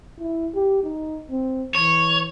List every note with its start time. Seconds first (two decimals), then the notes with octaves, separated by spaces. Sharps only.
0.19 E4
0.55 G4
0.83 D#4
1.31 C4
1.75 E3 C#5